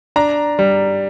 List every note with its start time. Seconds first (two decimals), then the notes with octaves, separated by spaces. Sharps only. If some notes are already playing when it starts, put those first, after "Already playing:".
0.16 D4 A#5
0.59 G3